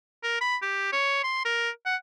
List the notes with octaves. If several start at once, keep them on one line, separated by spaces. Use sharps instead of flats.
A#4
B5
G4
C#5
C6
A#4
F#5